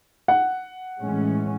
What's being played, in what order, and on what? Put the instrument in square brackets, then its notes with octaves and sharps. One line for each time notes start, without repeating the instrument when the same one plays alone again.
[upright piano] F#5
[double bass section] A2 E3 G#3 C#4